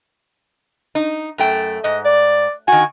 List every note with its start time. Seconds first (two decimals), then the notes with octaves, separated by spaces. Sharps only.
0.95 D#4
1.38 F#2 A3 G5
1.84 G#2 D#5
2.05 D5
2.68 D#3 F#4 G#5